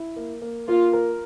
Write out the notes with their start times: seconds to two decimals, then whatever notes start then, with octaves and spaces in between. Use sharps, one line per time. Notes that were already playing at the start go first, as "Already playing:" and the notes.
Already playing: E4
0.16 A#3
0.42 A#3
0.68 A#3 F4
0.93 A#4